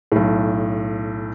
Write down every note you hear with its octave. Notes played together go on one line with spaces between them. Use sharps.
B1 A2